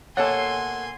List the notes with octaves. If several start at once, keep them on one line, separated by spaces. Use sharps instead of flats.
B2 A#3 A4 C#5 F#5 G#5 C6